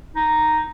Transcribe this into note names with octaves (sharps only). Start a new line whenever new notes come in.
D#4